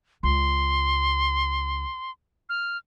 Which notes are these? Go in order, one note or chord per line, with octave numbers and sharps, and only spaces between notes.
C#2 C6
F6